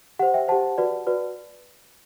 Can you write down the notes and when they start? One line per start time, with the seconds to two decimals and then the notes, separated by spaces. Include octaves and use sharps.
0.19 G4 C5 F#5
0.34 E5 G5
0.48 G4 C5 F#5 A5
0.78 F#4 B4 D5
1.07 F#4 B4 D5